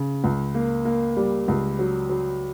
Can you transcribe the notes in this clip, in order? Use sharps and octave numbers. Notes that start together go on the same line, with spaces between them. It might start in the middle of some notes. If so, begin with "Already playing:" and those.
Already playing: C#3
C#2
A#3
A#3
G3
C#2
F#3
F#3